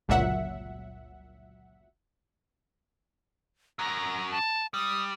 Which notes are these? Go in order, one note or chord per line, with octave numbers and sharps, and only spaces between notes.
G1 C#2 A#2 F#3 E5 F#5
F#2 F#3 A#5
A5
G3 D#6